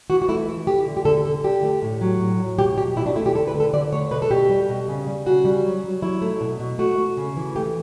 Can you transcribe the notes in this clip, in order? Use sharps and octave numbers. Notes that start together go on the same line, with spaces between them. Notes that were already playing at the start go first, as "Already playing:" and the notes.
E3 F#4
F#4
A3 E4
A3
A3 G4
D3
G4
D3 A4
D3 A4
D3 G4
A3
A2
F#3
A2
A2
B2 G4
B2 G4
B2 E4
D4
A3 E4
G4
D3 A4
B4
D3
A4
D3 D5
A3 C#5
B2 B4
A4
B2 G4
G3
B2
C#3
G3
C#3 F#4
G3
F#3
F#3
F#3 E4
A3
B2
B2
A3 F#4
A3
C#3
E3
A3 G4